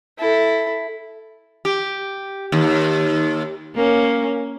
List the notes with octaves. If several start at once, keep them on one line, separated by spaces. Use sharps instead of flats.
E4 A4
G4
D#2
A#3 C#4